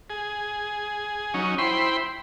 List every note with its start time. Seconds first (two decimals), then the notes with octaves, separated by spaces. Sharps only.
0.10 G#4
1.34 F#3 C#4 D#4
1.58 E4 C5 G5 B5 C6